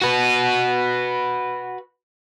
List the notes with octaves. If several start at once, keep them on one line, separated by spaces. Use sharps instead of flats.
F#4 B4